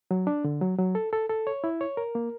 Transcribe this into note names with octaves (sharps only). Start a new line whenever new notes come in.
F#3
D4
D3
F#3
F#3
A4
A4
A4
C#5
E4
C#5
A#4
A#3